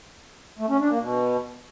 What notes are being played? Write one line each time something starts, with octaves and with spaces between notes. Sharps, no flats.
A3
C#4
D4
A#3
B2